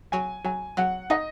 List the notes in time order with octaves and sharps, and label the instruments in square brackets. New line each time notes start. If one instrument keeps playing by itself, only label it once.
[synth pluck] F#3 [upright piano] G#5
[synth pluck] F#3 [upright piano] G#5
[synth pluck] F#3 [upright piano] F#5
[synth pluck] D#4 [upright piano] D#5